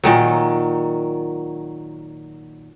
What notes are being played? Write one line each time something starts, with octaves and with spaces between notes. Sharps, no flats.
A#2 D#3 F#3